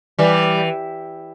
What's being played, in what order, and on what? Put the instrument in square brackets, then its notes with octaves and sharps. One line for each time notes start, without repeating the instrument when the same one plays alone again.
[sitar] E3 G3